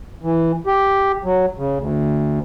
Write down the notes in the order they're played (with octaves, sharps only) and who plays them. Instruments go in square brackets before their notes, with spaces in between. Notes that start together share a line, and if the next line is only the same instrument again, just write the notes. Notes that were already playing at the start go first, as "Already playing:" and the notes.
[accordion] E3
G4
F#3
C#3
D2